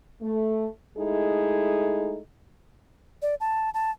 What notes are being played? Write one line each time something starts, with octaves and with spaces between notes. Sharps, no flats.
A3
G#3 A3 D#4 E4 G#4 A4
D5
A5
A5